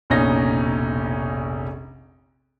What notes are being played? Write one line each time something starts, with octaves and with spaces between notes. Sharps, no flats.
F1 A#1 B2 C#4 D#4 A#6